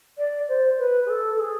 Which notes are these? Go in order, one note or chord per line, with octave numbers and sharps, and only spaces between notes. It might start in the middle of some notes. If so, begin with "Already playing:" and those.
D5
C5
B4
G#4
A4
A4
G#4